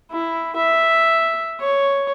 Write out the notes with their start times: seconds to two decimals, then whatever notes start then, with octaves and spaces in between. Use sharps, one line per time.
0.11 E4
0.56 E5
1.60 C#5